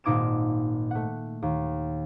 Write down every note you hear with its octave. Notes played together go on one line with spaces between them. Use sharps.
G#1 A#2 D#4 D6 G#6 E7
A3 F#5
D#2